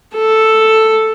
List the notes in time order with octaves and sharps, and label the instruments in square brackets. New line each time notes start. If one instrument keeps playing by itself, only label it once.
[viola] A4